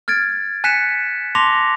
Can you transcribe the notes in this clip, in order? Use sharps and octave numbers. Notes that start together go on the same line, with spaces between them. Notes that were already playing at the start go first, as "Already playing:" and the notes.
F6 G#6 A6 D7
G#5 F#6 B6 C#7 E7
A5 C6 D6 A#6 F7